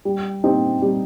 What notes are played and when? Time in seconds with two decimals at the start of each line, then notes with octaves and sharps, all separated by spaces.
0.05 G3
0.44 C4 D#4 G4
0.82 G3